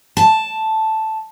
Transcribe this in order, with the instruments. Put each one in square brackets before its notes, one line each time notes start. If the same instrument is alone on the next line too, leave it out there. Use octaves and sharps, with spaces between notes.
[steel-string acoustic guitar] A5